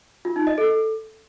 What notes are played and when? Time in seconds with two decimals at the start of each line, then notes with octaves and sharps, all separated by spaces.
0.25 F4
0.36 D#4
0.47 D#5
0.58 A4